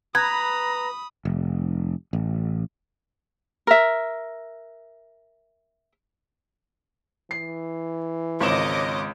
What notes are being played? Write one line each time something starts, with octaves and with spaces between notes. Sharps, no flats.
B4 A#5 B5 D#6 G#6
F1
A1
A#4 E5
E3 C7
G#1 C#2 C#5 D#5 D6 E7